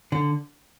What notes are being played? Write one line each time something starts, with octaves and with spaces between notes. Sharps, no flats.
D3